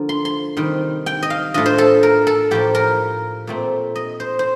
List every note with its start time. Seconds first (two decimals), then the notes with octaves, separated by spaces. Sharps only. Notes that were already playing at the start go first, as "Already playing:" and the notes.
Already playing: D3 F3 A#3 F4
0.09 C6
0.25 C6
0.57 C3 D#3 G3
1.06 G5
1.23 D#5
1.30 F5
1.54 A2 A3 D4 F4 D#5
1.66 C5
1.78 A4
2.03 A#4
2.27 A4
2.51 A2 F3 A#3 G4
2.75 A#4
3.47 A#2 A3 C4
3.96 D#5
4.20 C5
4.39 C5